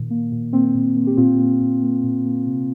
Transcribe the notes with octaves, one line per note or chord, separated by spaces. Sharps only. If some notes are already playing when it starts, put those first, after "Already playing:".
Already playing: A#2 D#3
A#3
A#2
A#3 C4
A#2
A#3
G4
A#2 C4 F4
A#3
A#2
A#3
A#2
A#3
C3